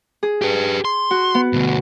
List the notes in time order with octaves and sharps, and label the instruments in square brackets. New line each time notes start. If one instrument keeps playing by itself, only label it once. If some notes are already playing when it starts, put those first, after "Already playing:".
[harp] G#4
[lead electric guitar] G4 B4
C6
[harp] F#4
B3
[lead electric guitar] D2 B2